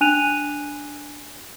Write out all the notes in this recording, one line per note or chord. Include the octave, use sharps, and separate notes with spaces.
D4 G#5 F#6 D#7 F7